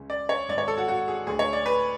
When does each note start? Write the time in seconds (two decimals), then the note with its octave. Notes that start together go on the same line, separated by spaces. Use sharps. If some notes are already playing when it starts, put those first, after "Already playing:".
Already playing: C#2 C#3
0.10 D5
0.29 C#5
0.49 G#1 G#2 D5
0.58 C#5
0.68 A4
0.78 F#4
0.88 F#4
1.08 G#4
1.27 D2 D3 G#4
1.39 C#5
1.53 D5
1.66 B4